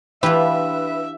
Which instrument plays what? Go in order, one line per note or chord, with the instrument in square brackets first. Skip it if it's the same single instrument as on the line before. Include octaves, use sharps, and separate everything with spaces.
[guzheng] E3 G4 [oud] D4 F4 [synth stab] B4 [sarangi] E5